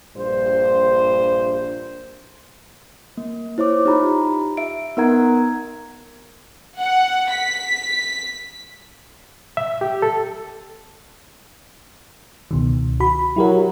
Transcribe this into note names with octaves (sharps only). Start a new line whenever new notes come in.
A#1 G2 C5
A#3
E4 C5 C#5 D6
D#4 F4 G4 A#5 B5
E5 D7
B3 D#4 A#4 F#5 A#5 G#6
F#5
B6
E5
G4
A4
C#2 B2 D#3
F#4 B5
F#3 E4 G4 A#4